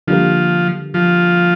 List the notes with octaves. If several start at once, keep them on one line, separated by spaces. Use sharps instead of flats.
D3 F3 G3 A#3
F3